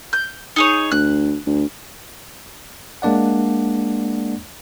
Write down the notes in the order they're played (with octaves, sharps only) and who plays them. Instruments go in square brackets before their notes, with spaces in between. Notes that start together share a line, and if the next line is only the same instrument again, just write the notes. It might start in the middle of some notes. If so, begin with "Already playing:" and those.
[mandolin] G6
D#4 G#4 C#5
[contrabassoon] D2 [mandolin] F#6
[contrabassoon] D2
[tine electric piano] G#3 A#3 D4 D5 F#5